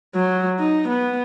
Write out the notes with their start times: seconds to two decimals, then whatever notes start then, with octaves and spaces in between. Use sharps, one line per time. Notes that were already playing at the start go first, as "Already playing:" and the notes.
0.15 F#3
0.60 D#4
0.89 B3